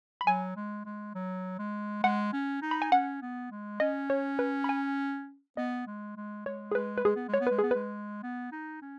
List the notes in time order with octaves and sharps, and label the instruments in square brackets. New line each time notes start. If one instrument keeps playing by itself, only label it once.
[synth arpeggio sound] B5
[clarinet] F#3 [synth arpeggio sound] G#5
[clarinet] G#3
G#3
F#3
G#3
[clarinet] G#3 [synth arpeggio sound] F#5
[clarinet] C#4
D#4
[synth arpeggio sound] B5
G#5
[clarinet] C#4 [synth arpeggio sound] F#5
[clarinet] B3
G#3
[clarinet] C#4 [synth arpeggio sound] D#5
[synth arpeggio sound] C#5
B4
B5
G#5
[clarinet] B3 [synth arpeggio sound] D#5
[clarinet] G#3
G#3
[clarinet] G#3 [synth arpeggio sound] C#5
[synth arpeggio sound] G#4
[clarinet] G#3 [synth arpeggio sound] B4
[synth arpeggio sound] B4
[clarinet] G#3 [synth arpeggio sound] G#4
[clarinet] B3
G#3
[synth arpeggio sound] C#5
[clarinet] B3
[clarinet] G#3 [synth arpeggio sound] B4
[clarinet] B3 [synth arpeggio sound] G#4
[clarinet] G#3 [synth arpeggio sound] B4
[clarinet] B3
D#4
C#4